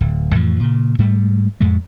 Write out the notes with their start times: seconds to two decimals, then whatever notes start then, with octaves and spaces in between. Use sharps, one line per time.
0.01 D1
0.35 F2 A2 E3 F3
0.60 A#2 C#3
0.99 G#2 G3 A3
1.61 F2 A2 G#3 A3